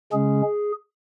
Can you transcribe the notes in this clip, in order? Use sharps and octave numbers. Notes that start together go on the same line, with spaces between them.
C#3 G#3 C#4 G#4